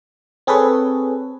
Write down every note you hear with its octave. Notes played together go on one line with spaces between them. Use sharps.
C4 G#4 A4 B4 C#5